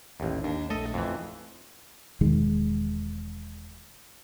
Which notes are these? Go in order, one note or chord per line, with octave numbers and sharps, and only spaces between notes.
A1 D#2
D#2 D4
A#1 A3 A4 D#5
F2 E3
E1 D#3 G#3